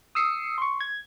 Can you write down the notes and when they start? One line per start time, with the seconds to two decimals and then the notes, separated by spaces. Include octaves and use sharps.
0.15 D#6 E6 C7 C#7
0.58 C6 C#6
0.80 G#6